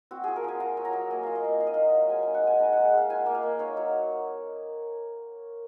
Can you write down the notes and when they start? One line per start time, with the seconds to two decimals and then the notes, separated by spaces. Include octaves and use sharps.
0.11 C4 F#4
0.24 F3 G#4
0.36 A#4
0.44 F3 G#5
0.60 F4 A#5
0.77 F#3
0.85 A#5
0.93 F#3
1.10 A#3 G#5
1.23 F4 F5
1.35 D#5
1.44 A#3
1.60 D#4 F5
1.67 D#5
1.74 F#3 F5
1.93 F#3
2.10 G#3 G#5
2.23 D#4 G#5
2.34 F#5
2.44 G#3 G#5
2.60 D#4 A#5
2.73 G#3 F#5
2.85 F#5
2.93 G#3 F5
3.10 F4 G#5
3.26 A#3
3.35 F5
3.43 A#3
3.59 D#4 C#5
3.77 F#3